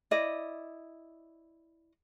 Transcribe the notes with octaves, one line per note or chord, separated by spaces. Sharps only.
E4 D5 D#5